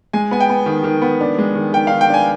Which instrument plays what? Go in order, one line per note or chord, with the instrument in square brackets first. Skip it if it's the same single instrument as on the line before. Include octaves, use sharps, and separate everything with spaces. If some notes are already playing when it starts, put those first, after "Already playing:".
[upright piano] G#3 [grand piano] G#5
[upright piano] B3 [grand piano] G#5
[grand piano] G5
[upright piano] B3
D#3
D#3
B3
D4
G#3
D#3
[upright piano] D#3 [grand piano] G5
[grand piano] F5
[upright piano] D#3
[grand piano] G5
[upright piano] D4 [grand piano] G#5